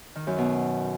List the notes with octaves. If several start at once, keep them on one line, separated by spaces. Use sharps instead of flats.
D#3
F#2
B2